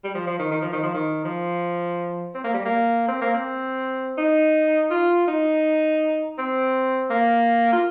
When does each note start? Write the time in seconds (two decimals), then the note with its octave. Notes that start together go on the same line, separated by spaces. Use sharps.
0.04 G3
0.14 F3
0.27 F3
0.39 D#3
0.51 D#3
0.62 F3
0.73 D#3
0.83 F3
0.94 D#3
1.25 F3
2.35 C4
2.44 A#3
2.54 G3
2.65 A#3
3.08 C4
3.22 A#3
3.34 C4
4.18 D#4
4.90 F4
5.27 D#4
6.38 C4
7.10 A#3
7.73 F4